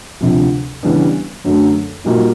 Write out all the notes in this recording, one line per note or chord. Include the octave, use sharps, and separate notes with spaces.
D2 C3 F3
C#3 E3 G3 B3 D4
F#2 D3 F#3 A3
A#2 G3 A#3 D#4 F#4